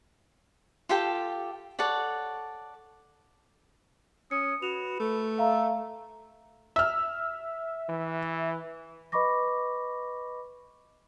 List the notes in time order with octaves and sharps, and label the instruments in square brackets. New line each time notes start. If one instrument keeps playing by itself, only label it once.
[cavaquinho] F4 G4 A4 G5
A4 C#5 D5 F#5
[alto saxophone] C#4 [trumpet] D#6 [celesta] C#7
[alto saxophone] F#4 [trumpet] B4 [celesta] F7
[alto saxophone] A3
[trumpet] E5 [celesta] F5 A#5
[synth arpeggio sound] E5 [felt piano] E6 F6
[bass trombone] E3
[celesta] B4 D#5 B5 C#6 D6 A#6